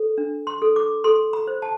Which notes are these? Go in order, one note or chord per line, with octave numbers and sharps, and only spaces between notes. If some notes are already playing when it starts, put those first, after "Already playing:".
Already playing: A4
D4
C6
A4
D6
A4 C6
B5
C5
A5